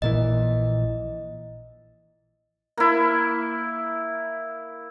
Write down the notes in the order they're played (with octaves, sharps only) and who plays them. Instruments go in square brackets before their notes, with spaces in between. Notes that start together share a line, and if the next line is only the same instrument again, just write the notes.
[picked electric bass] A#1 A#2 E3 [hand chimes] D#5
[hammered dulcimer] A#3 E4